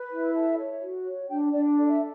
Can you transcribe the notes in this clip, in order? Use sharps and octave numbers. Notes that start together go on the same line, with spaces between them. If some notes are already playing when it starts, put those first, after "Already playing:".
Already playing: B4
E4
A4 E5
C#5
F#4
C#5
D4 G5
D4 D5
A4 D5
E5